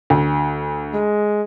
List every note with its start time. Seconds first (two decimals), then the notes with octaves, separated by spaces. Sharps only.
0.10 D2
0.94 G#3